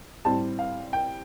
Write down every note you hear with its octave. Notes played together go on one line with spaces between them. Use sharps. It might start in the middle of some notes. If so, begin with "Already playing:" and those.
A2 G3 C4 A5
F5
G5